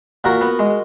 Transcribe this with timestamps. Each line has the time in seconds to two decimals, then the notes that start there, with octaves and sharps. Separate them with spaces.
0.24 A#2 F#4 A#4
0.41 B3
0.59 G#3